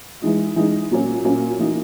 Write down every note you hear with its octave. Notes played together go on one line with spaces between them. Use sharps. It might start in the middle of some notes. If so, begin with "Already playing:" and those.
E3 G#3 D#4
E3 G#3 D#4
A#2 F#3 A#3 C#4
A#2 F#3 A#3 C#4
E3 A#3 D#4 F#4